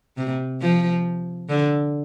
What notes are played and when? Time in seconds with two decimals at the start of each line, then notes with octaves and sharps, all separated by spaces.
0.17 C3
0.61 F3
1.49 D3